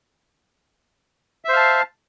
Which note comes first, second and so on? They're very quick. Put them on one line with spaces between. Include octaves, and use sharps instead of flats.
E5 C5 F5 A5